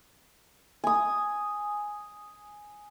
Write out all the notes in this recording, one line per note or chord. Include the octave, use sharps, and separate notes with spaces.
G#5 D#6